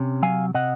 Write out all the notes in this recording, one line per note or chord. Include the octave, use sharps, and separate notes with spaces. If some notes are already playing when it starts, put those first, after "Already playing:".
Already playing: C3 C#4
F#3 F5 G#5
C3 D#5 F#5